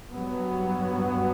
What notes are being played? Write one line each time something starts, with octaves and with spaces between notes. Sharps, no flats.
G2 F#3 B3